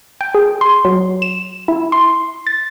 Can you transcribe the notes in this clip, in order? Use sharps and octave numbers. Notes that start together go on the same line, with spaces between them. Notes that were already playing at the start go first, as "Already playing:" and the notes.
G5
G#4
C6
F#3
E7
E4
C6
A6